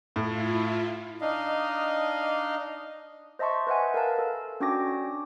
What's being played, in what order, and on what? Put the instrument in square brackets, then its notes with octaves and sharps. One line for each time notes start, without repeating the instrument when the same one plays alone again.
[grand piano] A2 [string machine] E4 F4
[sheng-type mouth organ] D4 D#4 D#5 F5
[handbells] C5 D#5 E5 A5 C6 C#6
B4 C5 D#5 E5 F#5 G#5
A#4 B4 F5 A5
A4
C#4 D4 F#4 G5 D6 A#6